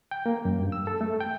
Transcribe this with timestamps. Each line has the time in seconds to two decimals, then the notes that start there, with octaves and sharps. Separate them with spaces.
0.11 G5
0.26 A#3
0.45 F#2
0.60 G2
0.72 E6
0.87 A4
1.01 A3
1.21 G5